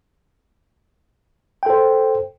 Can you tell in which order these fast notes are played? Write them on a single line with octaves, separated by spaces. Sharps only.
G5 A4 C5